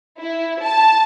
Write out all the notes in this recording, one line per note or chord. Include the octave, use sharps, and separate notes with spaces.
E4
A5